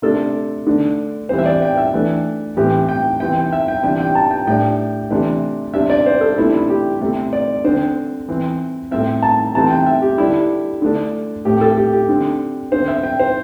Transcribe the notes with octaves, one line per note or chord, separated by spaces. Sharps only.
C3 A3 D4 A4
D3 A3 D4
E3 G3 C4 C5
E5
D5
G5
E5
E3 A3 D4
A2 E3 C4 G4
G5
C3 E3 C4 G5
G5
E5
G5
C3 E3 G3 D4 G5
G5
A5
G5
A2 G3 D4 G5
C3 E3 A3 D4
C3 G3 D4 E5
D5
C5
A4
C3 A3 D4 E4
E4
G4
C3 A3 C4
D5
D3 C4 C5
E3 C4
A2 A3 C4 E5
A5
C3 E3 A3 C4 A5
G5
E5
G4
D3 G3 D4 E4
D3 A3 D4
A2 A3 C4 G4
A4
G4
G4
D3 C4
D3 C4 C5
E5
G5
C5